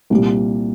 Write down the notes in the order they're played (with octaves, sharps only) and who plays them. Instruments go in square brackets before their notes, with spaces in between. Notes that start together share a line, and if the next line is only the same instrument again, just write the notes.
[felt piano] C2 A#2 G3